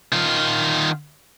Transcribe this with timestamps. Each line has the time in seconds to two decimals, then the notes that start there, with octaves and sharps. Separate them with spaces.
0.12 D#3 F4